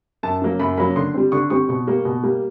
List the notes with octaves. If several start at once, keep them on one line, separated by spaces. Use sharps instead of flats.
F#2 A5
C#3 F#3 A#3
F#2 B5
C#3 F#3 A#3 B5
D3 C6
G3 C4
D3 C#6
G3 C4 C#6
B2 C#6
G3 A#3
B2
G3 A#3